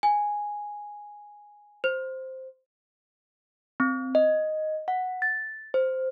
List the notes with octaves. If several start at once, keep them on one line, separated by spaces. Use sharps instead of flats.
G#5
C5
C4
D#5
F#5
A6
C5